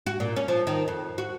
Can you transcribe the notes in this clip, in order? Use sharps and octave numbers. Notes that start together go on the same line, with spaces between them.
F#4
A#2
C#4
F3
D#3
F2
F#4